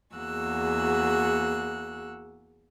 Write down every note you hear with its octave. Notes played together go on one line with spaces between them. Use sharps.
E2 A#3 F#4 G#4 E6 F#6